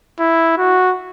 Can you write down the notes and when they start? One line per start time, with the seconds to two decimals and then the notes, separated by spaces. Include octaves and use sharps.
0.20 E4
0.58 F#4